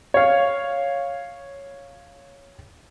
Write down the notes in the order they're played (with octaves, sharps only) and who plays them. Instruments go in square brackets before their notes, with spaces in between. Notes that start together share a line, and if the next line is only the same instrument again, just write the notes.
[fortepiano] C#5 F5